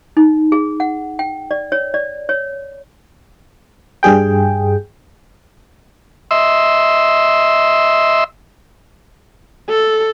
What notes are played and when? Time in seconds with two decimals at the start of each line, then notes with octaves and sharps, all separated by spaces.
0.17 D#4
0.52 G#4
0.80 F#5
1.19 G5
1.51 D5
1.72 C#5
1.94 D5
2.29 C#5
4.03 G2 G3 G#4 G5
6.31 D#5 E5 C6 E6
9.69 A4